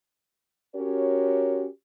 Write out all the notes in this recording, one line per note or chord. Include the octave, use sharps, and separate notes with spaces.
C#4 F#4 G4 A#4 C#5